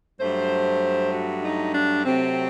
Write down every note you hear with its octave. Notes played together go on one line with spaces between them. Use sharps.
G2 F#3 A3 C5
F#4
D#4
D4
C3 F#3 A3 C4